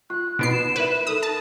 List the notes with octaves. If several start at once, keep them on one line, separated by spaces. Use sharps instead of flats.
F4 F#6
B2 B3 D#4 E4 C7 D7
E7
A#4 B4 D5 E5
D#4 A4 A#4 D#6
A5